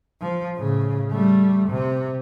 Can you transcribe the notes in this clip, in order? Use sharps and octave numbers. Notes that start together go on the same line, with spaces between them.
F3
A2 C#3
G3 A3
C3